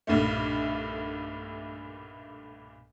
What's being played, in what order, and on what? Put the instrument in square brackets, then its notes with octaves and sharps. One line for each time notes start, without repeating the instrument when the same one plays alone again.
[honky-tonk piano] B1 G2 A#2 A3